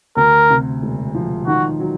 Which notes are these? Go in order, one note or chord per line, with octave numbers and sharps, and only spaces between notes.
D2 A#4
C3
E1
F3
D#3 F#4
F#3